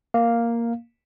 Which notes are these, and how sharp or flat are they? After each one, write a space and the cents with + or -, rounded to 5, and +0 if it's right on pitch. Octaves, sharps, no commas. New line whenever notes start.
A#3 +0 F5 +0